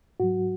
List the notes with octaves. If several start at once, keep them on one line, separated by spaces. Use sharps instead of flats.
G#2 F#3 F#4